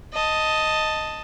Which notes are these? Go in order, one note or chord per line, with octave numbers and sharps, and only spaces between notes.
D#5 A5